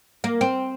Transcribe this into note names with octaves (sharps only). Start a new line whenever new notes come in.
A#3
C4